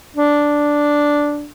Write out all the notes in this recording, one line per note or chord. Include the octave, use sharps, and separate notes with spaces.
D4